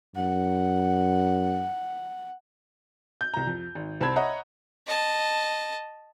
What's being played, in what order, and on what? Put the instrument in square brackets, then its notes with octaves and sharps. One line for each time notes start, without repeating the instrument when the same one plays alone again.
[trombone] F#2 [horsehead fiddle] F#5
[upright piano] G6
C2 A#5
F2
G#1
C2 C4 A5 B5 G#6
C#5 D#5 E5 F#5 A#5 B5
[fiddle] D#5 A5